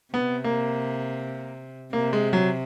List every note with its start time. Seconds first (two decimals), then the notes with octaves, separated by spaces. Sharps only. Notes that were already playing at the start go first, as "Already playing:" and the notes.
0.14 C3 B3
0.44 A#3
1.93 C3 A#3
2.13 G#3
2.33 F#3